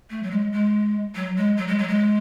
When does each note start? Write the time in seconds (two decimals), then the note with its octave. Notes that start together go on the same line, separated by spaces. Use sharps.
0.10 A3
0.23 F#3
0.31 G#3
0.52 G#3
1.15 F#3
1.37 G#3
1.57 F#3
1.68 G#3
1.78 F#3
1.88 G#3